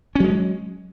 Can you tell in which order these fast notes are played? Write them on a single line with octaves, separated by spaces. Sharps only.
C#4 F#3 G#3